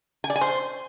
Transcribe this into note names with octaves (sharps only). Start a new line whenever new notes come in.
G#5
D5
G#5
C5